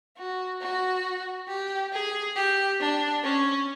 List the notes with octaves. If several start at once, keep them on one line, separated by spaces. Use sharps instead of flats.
F#4
F#4
G4
G#4
G4
D4
C#4